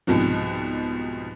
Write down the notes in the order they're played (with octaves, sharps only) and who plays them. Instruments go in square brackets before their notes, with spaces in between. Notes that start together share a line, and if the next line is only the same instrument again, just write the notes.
[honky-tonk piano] C2 G#2 B2 F3